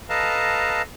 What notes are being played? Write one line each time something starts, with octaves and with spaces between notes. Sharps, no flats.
A4 B4 D#5 F5 A5 A#5